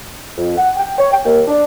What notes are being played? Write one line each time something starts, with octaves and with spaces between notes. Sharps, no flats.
F2
F#5
G5
C#5
G5
D#2
D4